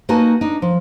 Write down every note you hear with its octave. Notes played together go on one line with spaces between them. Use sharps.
A#3 D#4 F#4 B4 G#5 A5
D4 D#4
F3